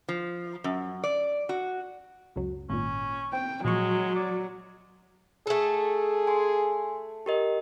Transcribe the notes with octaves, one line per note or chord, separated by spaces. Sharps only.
F3
F#2
D5
F#4
C#2 F#2 F#3
G#1 A#2 C#4
C4 G5
A#2 F3 F#3 G#3 C#6
D5
A3 G#4 A4
G#5 C6
G4 A#4 D#5